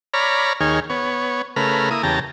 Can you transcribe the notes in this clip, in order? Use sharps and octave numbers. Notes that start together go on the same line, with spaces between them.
C#5 D5 A#5 B5 F6
D#2 D#3 G#4 C#5 F6
B3 C#5
C#3 A3 A#4 B4 F6
A#3 E4 D#6
E2 C#3 G4 A5 A#5